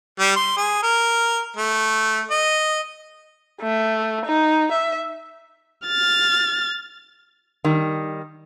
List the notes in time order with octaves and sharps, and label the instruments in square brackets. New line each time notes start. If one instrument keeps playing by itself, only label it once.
[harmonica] G3
C6
G#4
A#4
A3
D#5
[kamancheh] A3
D#4
E5
[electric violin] F6 A6
[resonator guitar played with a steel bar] D#3 G3